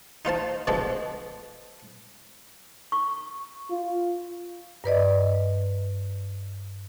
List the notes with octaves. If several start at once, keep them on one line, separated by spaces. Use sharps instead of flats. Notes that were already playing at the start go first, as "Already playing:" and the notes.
D#4 F4 C5 A5
B2 D3 F3 G#3 A4
C#6
F4
G2 B4 D5 D#5